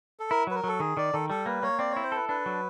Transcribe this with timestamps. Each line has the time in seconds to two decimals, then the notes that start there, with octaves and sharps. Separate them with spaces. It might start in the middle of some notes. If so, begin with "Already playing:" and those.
0.20 A4
0.31 E4 A#4
0.47 F#3 B4
0.55 A#4
0.64 F#3 A4
0.80 D#3 G#4
0.97 D#3 D5
1.13 D#3 A4
1.30 G3 A4
1.46 A#3 B4
1.63 A#3 C#5
1.79 C4 D5
1.91 C#5
1.96 E4
2.04 C5
2.12 A4 B4
2.29 D4 B4
2.46 F#3